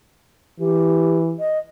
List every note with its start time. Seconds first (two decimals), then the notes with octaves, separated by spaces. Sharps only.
0.60 E3 G4
1.40 D#5